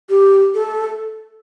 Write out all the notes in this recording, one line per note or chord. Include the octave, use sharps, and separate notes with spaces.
G4
A4